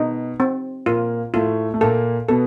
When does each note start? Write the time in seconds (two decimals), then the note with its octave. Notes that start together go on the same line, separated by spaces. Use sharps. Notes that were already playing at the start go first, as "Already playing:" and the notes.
Already playing: B2 B3 D#4
0.40 C4
0.86 A#2 A#3 F4
1.34 A2 A3 F4
1.74 A3
1.81 A#2 A#3 A4
2.29 B2 B3 A4